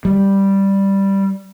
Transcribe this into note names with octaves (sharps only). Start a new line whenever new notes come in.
G3